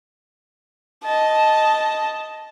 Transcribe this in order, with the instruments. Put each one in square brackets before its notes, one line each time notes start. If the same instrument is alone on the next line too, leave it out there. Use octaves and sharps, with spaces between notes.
[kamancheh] D#5 A5